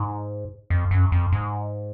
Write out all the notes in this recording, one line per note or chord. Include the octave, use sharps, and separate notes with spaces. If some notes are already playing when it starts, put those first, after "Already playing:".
Already playing: G#2
F2
F#2
F2
G#2